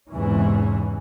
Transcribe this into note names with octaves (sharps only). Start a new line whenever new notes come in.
E2 G#2 C3 E3 C#4